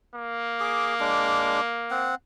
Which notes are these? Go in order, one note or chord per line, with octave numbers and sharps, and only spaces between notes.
A#3
G#4 D6
G#3 D4 D6
C4 F#5